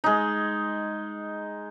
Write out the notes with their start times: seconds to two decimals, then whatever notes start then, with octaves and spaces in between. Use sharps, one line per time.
0.04 G#3 D#4